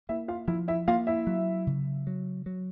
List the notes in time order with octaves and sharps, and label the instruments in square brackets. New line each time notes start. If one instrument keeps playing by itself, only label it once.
[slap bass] A#3 [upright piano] E4 E5
[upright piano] F4 F5
[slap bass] F3 [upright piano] E4 E5
[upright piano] E4 E5
[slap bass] A#3 [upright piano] F4 F5
[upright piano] E4 E5
[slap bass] F#3
C#3
F#3
F#3